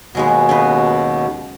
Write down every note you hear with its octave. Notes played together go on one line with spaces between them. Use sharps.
D#2 B2 F#3 G#3 B3
C#3 D#4 B4